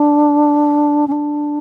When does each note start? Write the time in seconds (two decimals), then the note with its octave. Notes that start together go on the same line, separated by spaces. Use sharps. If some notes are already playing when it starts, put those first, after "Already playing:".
Already playing: D4
1.07 C#4
1.12 D4